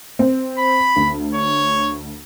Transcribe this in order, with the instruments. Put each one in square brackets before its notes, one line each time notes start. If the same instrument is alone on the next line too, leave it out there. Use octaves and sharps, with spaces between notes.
[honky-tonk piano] C4
[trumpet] B5
[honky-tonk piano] D2
[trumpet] C#5